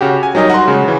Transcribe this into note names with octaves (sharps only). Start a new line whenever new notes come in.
C#3 F#4 G4
G#5
F#3 G3 D#4 A#4 D#5
F#4 C6
C#3 G#3
C#3 E3